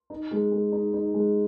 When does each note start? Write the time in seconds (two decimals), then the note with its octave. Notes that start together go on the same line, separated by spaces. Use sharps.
0.10 D#4
0.31 G#3
0.52 G#3
0.72 D#4
0.94 D#4
1.14 G#3